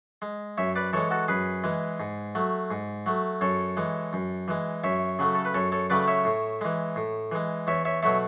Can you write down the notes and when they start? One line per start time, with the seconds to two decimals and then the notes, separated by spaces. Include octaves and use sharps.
0.22 G#3
0.58 F#2 C#5 E5
0.76 B4 D5
0.93 E3 G#3 A4 C#5
1.11 F#4 A4
1.28 F#2 G#4 B4
1.64 E3 G#3
2.00 G#2
2.35 F#3 A3
2.71 G#2
3.06 F#3 A3
3.41 F#2 A4 C#5
3.77 E3 G#3
4.13 F#2
4.48 E3 G#3
4.84 F#2 C#5 E5
5.19 C#3 F#3 A3
5.35 A4
5.45 B4
5.54 F#2 A4 C#5
5.72 A4 C#5
5.90 C#3 F#3 A3 B4 D5
6.08 C#5 E5
6.25 A2
6.61 E3 G#3
6.96 A2
7.32 E3 G#3
7.67 E2 C#5 E5
7.85 C#5 E5
8.03 B2 F#3 A3 C#5 E5